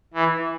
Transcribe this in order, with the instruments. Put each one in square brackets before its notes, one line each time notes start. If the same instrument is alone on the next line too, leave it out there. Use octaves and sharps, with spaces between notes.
[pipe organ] E3